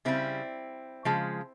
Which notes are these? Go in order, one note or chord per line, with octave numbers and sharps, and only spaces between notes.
C#3 G3 C4 E4
C#3 F3 G#3